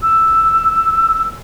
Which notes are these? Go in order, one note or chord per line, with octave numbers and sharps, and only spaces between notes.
E6